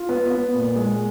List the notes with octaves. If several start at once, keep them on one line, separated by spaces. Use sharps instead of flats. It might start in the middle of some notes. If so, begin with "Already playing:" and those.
Already playing: F4
B3
B3
A#2
G#3